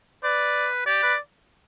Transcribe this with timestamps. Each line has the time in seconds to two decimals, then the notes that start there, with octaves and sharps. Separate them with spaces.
0.24 B4 D5
0.86 G4 D5
1.03 B4